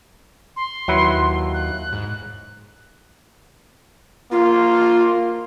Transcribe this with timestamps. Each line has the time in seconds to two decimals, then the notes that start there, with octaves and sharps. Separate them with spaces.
0.56 C6
0.88 D#2 F#3 E4 B4
1.54 F#6
1.93 G#2
4.32 A#3 F4